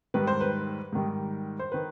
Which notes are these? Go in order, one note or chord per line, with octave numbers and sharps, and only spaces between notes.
G#2 D#3 G3 B4
C5
B4
G#2 D#3 G3
C5
D#3 B4